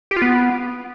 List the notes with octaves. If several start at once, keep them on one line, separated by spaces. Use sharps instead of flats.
G4
F4
B3